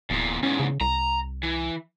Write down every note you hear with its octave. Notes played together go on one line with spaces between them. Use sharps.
D1 E2 A#2
E2 G#2 C#4
C#3
C2 A#5
E3